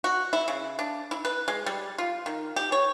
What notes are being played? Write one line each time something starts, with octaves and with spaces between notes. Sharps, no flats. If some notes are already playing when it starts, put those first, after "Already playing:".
F#4
E4
C#3
D4
E4
B4
G#3
G3
F4
D#3
G4
C#5